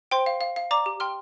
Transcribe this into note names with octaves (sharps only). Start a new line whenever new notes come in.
C5 G5 C6
F5
F5
F5
D5 A#5 D6
G4
G5 C6 F6